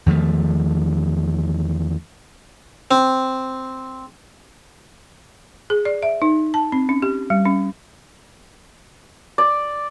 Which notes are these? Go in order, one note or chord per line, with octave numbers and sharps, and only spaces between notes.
E2 D#3 F3 A3
C4
G#4
D5
E5
D#4
A5
C4
C#4
G4
G3
C#4
D5